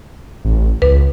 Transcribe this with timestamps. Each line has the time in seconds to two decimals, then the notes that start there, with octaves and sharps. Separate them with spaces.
0.45 A1
0.82 C#2 B4